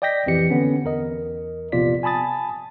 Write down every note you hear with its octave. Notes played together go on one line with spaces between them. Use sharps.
D5 D#5 G5 G6 A#6 B6
A#1 F2 E3 C4 G4 C#7
D3 B3 C#4
E2 A#4 D#5
A#1 C3 B3 F4 D5 B6
G#5 A5 B5 D#6 A6